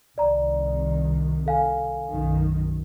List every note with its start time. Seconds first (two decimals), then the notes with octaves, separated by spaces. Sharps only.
0.18 C2 D#3 D5 A#5
1.46 A4 F5 G#5
2.08 B1 F#2 D#3